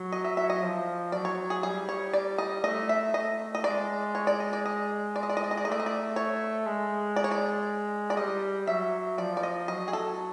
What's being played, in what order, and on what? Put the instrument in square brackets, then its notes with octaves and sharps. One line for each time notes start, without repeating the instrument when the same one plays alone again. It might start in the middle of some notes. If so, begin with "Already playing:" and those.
Already playing: [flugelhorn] F#3
[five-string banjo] D#5
E5
E5
D#5
[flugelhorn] F3
[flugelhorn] F#3 [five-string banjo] D5
[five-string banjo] C#5
G#4
[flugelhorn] G3 [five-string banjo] G#4
[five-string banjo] C#5
D5
D#5
[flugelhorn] A3 [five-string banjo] D#5
[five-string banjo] E5
[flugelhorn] A3 [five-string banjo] D#5
[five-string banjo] D#5
[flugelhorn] G#3 [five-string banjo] D5
[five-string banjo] C#5
D5
D#5
D5
D#5
D5
D#5
D5
D#5
D5
D#5
D5
[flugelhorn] A3 [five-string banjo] D#5
[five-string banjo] D5
D#5
D5
C#5
[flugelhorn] G#3
[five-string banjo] D5
C#5
D5
D5
[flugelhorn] G3 [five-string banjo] D#5
[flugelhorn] F#3 [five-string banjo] E5
[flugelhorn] F3 [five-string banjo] D5
[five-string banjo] D5
D#5
[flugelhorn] F#3 [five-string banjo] D#5
[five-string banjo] G#4
A4